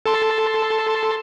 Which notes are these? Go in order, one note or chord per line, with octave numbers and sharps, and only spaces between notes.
A4 A5 C6